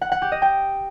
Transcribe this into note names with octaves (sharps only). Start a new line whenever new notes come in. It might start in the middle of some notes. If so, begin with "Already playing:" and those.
F#5
F#5
G4
D#5
G5